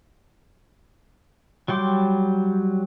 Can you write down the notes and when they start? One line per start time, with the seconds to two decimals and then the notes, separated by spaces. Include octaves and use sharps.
1.68 F#3 G3 G5 C6 D6